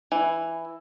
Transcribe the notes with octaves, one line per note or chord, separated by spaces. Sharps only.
E3